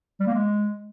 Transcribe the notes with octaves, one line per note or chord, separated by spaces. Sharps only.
G3
A#3
G#3